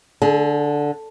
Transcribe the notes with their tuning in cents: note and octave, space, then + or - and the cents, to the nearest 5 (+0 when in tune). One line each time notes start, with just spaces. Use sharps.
D3 +0 G#4 +40